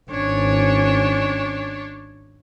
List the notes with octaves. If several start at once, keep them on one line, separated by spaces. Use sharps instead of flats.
G#1 C#4 D4 C#5